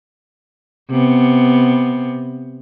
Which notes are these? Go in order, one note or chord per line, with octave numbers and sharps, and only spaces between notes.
C3 B3